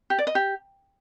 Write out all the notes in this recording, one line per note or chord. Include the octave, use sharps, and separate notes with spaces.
G4
D5
D#5
G4